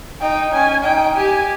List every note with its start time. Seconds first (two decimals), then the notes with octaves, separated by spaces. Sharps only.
0.21 D#4 G5
0.53 C#4 G#5
0.84 D#4 G5
1.15 G4 G#5